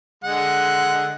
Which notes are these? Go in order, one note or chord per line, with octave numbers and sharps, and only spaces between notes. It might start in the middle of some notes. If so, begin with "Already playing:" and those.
D3 G#3 F#5